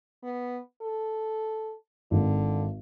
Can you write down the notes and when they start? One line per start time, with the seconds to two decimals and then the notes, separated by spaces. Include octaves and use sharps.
0.23 B3
0.81 A4
2.11 G#1 D3